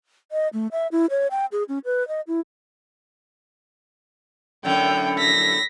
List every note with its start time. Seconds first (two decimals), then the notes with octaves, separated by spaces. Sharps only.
0.32 D#5
0.53 A3
0.72 E5
0.92 E4
1.10 C#5
1.31 G5
1.52 G#4
1.69 C#4
1.85 B4
2.08 D#5
2.27 E4
4.65 F#2 A2 D3 G5
5.18 A#6 B6